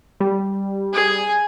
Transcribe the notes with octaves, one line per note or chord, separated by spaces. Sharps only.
G3
G#4 G#5